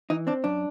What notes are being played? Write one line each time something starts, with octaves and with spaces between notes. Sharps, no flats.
E3 D#4
C4 D4
F#2 D4